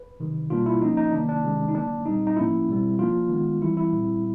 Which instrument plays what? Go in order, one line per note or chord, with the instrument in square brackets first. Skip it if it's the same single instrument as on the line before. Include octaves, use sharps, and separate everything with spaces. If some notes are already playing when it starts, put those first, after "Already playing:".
Already playing: [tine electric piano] B4
C3 D#3 F#3
B2 G3 A#3 D4 F4
E4
F3 A#3 C#4 D#4
D#4
C3 D#3 F#3 A#3 D4
D4
C3 D#3 G#3 C#4
D#4
D3 F#3 A#3 D4
A#2 G3 C4 D#4
D#4
A2 F3 A#3 C#4 E4
B2 G3 C4
F3 A#3 D4 F4
D#3 G#3 B3
E3 G3 C4 E4
E4
A#2 G3 C4